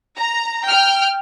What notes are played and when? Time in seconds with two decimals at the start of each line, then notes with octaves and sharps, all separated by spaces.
0.17 A#5
0.69 G5 F6